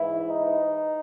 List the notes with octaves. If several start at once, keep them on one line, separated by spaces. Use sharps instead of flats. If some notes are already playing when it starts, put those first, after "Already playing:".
Already playing: G#2 E3 E4
D#4